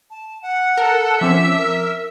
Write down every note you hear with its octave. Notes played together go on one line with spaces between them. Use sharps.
A5
F#5
A4 A#4
F3 C4 C#4 E5 D6
A#4